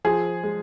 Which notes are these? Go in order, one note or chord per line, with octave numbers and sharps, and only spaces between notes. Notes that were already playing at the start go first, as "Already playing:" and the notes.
F3 G#4
G#3